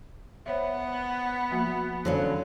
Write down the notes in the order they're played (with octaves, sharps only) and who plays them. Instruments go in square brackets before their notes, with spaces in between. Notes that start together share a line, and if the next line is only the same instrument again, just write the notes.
[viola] B3 [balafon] C5 C#5 E5
[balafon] F3 A#3 F#4
[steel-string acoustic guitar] D3 F#3 C#4 [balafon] C5 F5